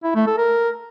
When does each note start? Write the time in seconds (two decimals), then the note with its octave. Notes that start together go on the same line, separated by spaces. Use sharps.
0.04 E4
0.15 A3
0.27 A4
0.38 A#4